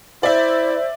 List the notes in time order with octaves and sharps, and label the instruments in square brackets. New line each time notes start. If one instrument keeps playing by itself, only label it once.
[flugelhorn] E4 [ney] C5 [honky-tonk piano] D5 E5